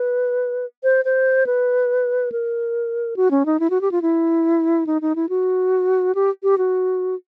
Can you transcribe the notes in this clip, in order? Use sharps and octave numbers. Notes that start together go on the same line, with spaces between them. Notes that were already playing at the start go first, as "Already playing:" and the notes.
Already playing: B4
C5
C5
B4
A#4
F#4
C#4
D#4
E4
F#4
G4
F4
E4
D#4
D#4
E4
F#4
G4
G4
F#4